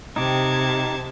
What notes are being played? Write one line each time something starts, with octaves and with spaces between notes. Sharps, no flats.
C3 D#4 G4 A5 G#6